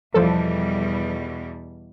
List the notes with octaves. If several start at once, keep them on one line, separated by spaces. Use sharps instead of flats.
E2 B2 F3 G3 A4